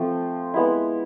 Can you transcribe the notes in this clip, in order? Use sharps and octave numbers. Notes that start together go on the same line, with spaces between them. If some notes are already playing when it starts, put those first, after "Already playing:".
Already playing: F3 A3 C4
G#3 B3 E4